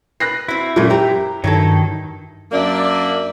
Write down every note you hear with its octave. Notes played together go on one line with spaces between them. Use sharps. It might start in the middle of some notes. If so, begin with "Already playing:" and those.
B4 F#6 A#6 C7
C4 E4 F#4
F#2 A#2 E3 G#3 A3
G4 C5 A#5
G2 D#3 F#3 E4 A4
F#2 A#3 D4 D5 E5